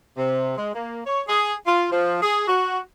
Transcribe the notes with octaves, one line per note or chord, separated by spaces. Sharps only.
C3
G#3
A#3
C#5
G#4
F4
F3
G#4
F#4